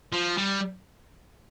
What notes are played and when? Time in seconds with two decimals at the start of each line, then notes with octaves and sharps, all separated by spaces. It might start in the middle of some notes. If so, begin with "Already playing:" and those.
0.13 F3
0.37 G3